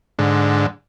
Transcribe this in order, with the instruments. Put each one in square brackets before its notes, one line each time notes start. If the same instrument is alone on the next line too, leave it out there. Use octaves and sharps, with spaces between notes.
[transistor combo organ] G#2 D3